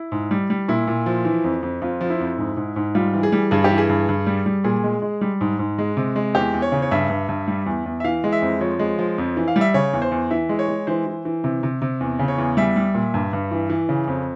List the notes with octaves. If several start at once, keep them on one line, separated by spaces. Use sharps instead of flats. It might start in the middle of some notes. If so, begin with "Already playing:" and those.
Already playing: E4
G#2
G3
G3
A#2 E4
A#2
F3
E3
F2
F2
F2 F4
F3
E4
F2
G#2
G#2
G#2
G3 F4
E3
G#4
G3
G2 G#4
G4
E3
G#4
G2
G2
G3
G3
A#2 G#4
G#3
G#3
G3
G#2
G#2
G#3
C3
G#3
E2 G4
E2
C#5
C#3
C#5
G2 E5
G2
G2
G3
E2
E2
E5
E3 F5
G#3
E5
F2
F3 C#5
G#3
F3
F2
E3
F5
G3
E5
C#3 C#5
E2
C5
E2
E3 E5
G#3
C#5
G#3
E3 C5
E3
E3
C3
C3
C3
E2
C#3
C#5
E2
G3 E5
G3
A#2
G2
G2
E3
E3
C#3
F2